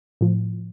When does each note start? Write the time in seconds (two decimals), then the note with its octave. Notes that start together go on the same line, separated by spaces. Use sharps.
0.21 A2 F3